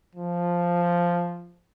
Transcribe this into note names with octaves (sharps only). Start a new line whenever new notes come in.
F3